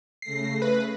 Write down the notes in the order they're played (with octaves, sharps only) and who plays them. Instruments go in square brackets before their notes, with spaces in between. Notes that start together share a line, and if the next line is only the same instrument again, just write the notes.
[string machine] C#3 A3 A#6 [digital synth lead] C7
[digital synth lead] B4